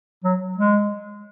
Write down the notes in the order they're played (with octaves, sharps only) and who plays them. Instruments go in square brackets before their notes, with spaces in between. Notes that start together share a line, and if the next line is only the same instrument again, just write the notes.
[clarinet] F#3
G#3